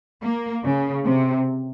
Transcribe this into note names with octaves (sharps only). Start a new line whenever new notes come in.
A#3
C#3
C3